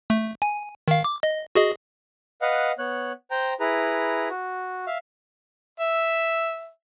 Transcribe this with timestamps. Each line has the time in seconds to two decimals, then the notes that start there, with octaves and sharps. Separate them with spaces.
0.10 A3
0.42 G#5
0.88 D#3 F5
1.04 D6
1.23 D#5
1.55 F#4 G#4 D#5
2.41 B4 D#5 F5 F#5
2.78 B3 C#5 F#6
3.31 C5 G5 A#5
3.60 E4 G#4 B4 A#5
4.30 F#4
4.87 E5 F5
5.80 E5